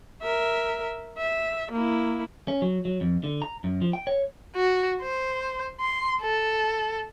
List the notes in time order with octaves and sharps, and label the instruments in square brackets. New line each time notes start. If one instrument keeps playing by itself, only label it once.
[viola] A#4 E5
E5
A#3 E4
[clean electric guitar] C#4
F#3
F#3
F2
D3
A#5
F#2
F3
G5
C#5
[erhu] F#4
C5
C6
A4